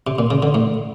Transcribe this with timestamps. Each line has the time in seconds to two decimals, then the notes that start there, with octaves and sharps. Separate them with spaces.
0.07 C3
0.19 A#2
0.31 C#3
0.43 D3
0.55 A2